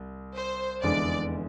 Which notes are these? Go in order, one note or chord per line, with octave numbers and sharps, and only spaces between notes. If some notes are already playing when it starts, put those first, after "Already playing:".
Already playing: C2
C5
F1 E2 D3 G#3 D4 D5